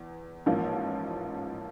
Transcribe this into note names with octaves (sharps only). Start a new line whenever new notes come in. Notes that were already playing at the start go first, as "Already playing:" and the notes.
Already playing: E2
A1 G#2 F3 A#3